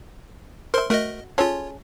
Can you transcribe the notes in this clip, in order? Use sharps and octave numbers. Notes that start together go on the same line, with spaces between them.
A#4 C5 E5 C6
A3 F#4 A#4 D#5
G#3 C#4 F4 A4 C#5